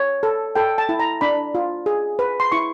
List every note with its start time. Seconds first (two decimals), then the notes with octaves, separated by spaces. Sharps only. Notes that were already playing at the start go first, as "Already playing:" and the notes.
Already playing: C#5
0.23 A4
0.55 A4 G5
0.78 A5
0.89 E4
1.00 A#5
1.21 D4 B5
1.55 F4
1.86 G#4
2.19 B4
2.40 C6
2.52 E4 C#6